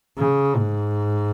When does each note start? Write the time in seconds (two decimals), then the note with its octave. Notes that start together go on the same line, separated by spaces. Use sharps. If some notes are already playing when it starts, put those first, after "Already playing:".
0.18 C#3
0.57 G#2